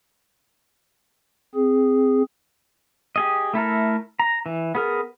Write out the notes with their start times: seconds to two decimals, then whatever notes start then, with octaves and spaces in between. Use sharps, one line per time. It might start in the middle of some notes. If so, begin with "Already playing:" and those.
1.55 C4 G#4
3.16 G4 G#4 D#5
3.54 A3 E4 A4 A#4
4.20 A#5
4.46 E3
4.75 B3 G#4 A#4